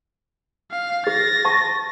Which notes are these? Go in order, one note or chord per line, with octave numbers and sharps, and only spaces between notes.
F5
G#4 A6 A#6
A5 C#6